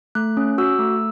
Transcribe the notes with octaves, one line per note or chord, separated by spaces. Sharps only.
A3 F#6
C#4
F#4 E6
A3